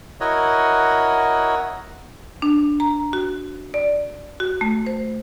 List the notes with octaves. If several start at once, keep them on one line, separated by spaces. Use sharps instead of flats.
E4 F#4 A#4 C#5 D#5 F#5
D4
A#5
F#4
D5
F#4
A3
C5